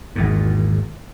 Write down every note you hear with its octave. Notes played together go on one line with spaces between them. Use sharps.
G#1 E2 A#2